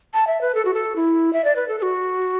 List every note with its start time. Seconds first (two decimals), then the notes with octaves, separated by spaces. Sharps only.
0.14 A5
0.27 E5
0.41 B4
0.55 A4
0.65 F#4
0.74 A4
0.96 E4
1.33 E5
1.44 D5
1.56 B4
1.68 A4
1.79 A4
1.82 F#4